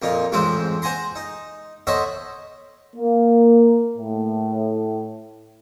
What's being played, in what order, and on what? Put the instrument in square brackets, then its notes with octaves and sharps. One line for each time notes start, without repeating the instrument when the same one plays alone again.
[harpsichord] F2 A#2 D#4 F4
A1 F2 G#2 G#3 C4 C5
C5 F#5 G#5 A#5 C6
D#4
A4 C5 C#5 D#5 E5 F#5
[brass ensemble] A#3
A2